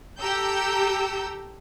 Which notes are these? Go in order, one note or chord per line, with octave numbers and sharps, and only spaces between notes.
G4 A4 G5 A#5 E6 G6